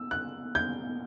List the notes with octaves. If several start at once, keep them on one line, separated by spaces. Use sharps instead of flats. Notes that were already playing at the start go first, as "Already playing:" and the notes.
Already playing: E6
F#6
G6